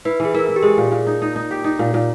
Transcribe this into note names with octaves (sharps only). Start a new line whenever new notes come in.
E4 B4
E3
G#4
E4 A#4
E4
G4
G#3 G#4
A#2
A#2
D#4
D#4
D#4
G4
D#4
A#2
A#2